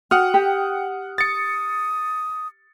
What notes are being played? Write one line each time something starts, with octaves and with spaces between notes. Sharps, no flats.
F#4 F#5 G5 D#6 F6
G4
D#6 A6 C#7